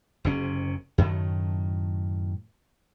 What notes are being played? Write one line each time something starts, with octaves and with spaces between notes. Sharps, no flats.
F#1 C3 C#4
F#2 A2 D#3 A3